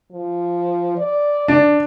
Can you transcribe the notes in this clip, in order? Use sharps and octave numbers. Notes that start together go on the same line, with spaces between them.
F3
D5
D4